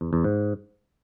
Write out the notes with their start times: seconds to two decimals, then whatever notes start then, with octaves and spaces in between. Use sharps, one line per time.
0.01 E2
0.13 E2
0.24 G#2